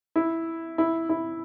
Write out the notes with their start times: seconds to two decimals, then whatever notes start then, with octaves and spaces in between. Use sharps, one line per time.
0.16 E4
0.78 E4
1.09 E4